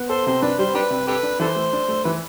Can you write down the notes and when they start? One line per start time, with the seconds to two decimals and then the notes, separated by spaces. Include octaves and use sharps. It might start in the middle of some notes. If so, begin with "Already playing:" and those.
Already playing: B3
0.09 A4 C5
0.26 C3 C5
0.42 D4 B4
0.58 G3 C5
0.74 D4 G4 B4
0.90 C3
1.08 G4 A4 B4
1.23 D4
1.40 E3 A4 C5
1.56 A3
1.73 D4
1.88 A3
2.04 E3 B4